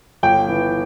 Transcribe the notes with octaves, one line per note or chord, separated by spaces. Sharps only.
G1 G5
E3